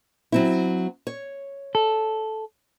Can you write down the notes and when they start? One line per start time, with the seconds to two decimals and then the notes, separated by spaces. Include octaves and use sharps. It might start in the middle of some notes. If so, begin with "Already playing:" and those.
0.32 F#3 C4 E4
1.07 C#5
1.75 A4